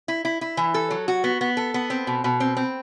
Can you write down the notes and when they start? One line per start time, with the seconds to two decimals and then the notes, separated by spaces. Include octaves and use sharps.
0.08 E4
0.25 E4
0.41 E4
0.57 E3
0.74 A4
0.91 F#3
1.08 F#4
1.24 B3
1.41 B3
1.57 A4
1.74 B3
1.90 C4
2.07 B2
2.24 B2
2.40 C4
2.57 C4